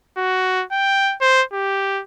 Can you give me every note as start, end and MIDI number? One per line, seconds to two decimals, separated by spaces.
0.18 0.64 66
0.72 1.15 79
1.21 1.43 72
1.53 2.03 67